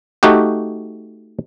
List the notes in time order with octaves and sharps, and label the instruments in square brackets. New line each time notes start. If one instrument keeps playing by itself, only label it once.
[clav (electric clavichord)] A3 D#4 F#4 G4